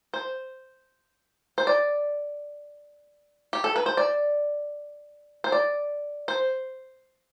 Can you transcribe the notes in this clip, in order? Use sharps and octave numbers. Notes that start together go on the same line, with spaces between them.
C5
C5
D5
G4
A4
B4
C5
D5
C5
D5
C5